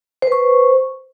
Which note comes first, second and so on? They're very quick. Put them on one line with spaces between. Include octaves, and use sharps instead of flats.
C5 B4 C#6